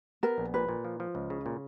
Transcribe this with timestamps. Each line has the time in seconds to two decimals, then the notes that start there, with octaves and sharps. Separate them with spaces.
0.23 B3 A#4
0.38 A#1
0.54 A#2 B4
0.69 A#2
0.84 F3
1.00 F3
1.15 C#2
1.30 C#3
1.46 A#2